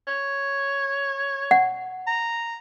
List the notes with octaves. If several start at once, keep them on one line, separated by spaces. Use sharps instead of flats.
C#5
F#5
A#5